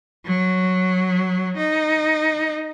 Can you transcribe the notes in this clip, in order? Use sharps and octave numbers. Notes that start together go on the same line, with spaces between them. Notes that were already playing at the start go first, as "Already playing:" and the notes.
F#3
D#4